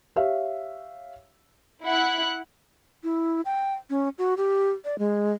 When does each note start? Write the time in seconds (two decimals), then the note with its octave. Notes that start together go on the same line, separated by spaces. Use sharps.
0.16 G4 C#5 E5 F5
1.85 E4 F#5 F#6
3.04 E4
3.45 G5
3.90 C#4
4.18 F#4
4.37 G4
4.85 D5
4.99 G#3